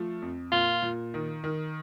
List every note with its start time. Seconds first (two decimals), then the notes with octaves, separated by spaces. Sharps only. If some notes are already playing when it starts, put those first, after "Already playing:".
Already playing: F3 A3
0.22 F2
0.52 A#2 F4
0.82 A#2
1.14 D#3
1.44 D#3